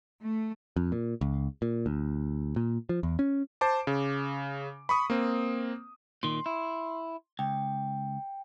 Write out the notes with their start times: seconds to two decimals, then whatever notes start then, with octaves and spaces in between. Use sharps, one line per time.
0.21 A3
0.76 F2
0.92 A#2
1.21 C#2
1.62 A#2
1.86 D2
2.56 A#2
2.89 F3
3.03 E2
3.19 C#4
3.61 C5 A5 D6
3.87 C#3
4.89 B5 C#6 D#6
5.10 A#3 C4
6.23 A#2 D#3 C6
6.46 E4
7.39 C#2 G5